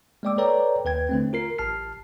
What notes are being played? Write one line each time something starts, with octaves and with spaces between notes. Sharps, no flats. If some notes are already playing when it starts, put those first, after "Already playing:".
G#3 A#3 D5 G5 D6 E6
A4 B4 C#5 D5 G5 A#5
D#2 B4 G5 G#6
D3 A3 C4
F4 A#4 C7
A1 A5 F6 C7